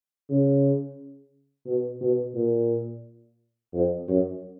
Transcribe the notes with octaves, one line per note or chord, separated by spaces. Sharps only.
C#3
B2
B2
A#2
F2
F#2